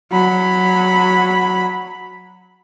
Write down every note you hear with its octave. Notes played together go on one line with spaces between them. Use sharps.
F#3 B5